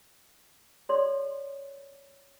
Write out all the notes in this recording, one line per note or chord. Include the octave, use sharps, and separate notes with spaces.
G#4 C#5 D5 C6